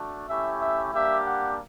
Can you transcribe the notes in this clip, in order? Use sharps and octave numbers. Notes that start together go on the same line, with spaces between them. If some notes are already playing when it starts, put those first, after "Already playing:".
Already playing: A3 D4 F#4
A3 C#4 E4 G4 E5
E5
G3 A#3 D4 G4 E5
F#5